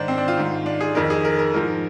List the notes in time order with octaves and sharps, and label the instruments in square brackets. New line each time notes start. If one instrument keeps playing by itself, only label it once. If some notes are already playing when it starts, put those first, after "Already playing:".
Already playing: [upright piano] G#2 D#3 D4 C5
C4
D4
F4
G#2 D#3
D4
G#4
F2 D#3 A#4
G#4
A#4
A#4
G#2 F3 A#4